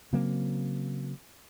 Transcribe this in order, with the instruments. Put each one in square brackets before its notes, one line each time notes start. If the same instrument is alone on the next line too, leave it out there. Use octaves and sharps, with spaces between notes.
[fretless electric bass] C#3 F#3 A#3 C4